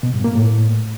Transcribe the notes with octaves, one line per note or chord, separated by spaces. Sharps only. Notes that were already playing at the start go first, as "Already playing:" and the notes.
B2
G2
A#3
A2